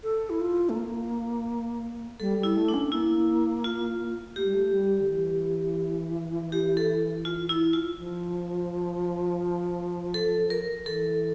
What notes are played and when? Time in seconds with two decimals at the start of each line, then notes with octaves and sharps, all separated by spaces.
0.03 A4
0.30 E4
0.40 F4
0.69 A3
0.75 A#3
2.20 G3 A4
2.38 G3
2.43 E4
2.56 A3
2.68 D4
2.74 C#4
2.86 C#4
2.92 A#3 E4
3.64 F4
4.36 A3 G4
4.45 G3
4.54 A3
4.72 G3
5.00 D3
5.09 E3
6.52 G4
6.77 A4
7.25 F4
7.49 E4
7.73 F4
7.98 F3
10.14 A4
10.50 A#4
10.86 E3 A4